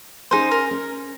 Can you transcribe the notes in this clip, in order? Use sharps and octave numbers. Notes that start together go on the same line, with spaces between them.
C#4 D#4 G#4 C5
A#4
C#4